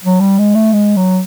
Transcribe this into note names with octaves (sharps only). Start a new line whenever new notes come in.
F#3
G3
G#3
A3
G#3
F#3